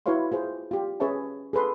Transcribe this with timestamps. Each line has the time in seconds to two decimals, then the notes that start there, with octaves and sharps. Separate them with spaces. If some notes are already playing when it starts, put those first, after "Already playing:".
0.06 E4 F#4 B4 C#5 F5 C6
0.32 F4 G#4 C5
0.71 F4 G4
1.00 C#4 G#4 B4 C#5 E5 A5
1.53 G#4 A4 B4 C6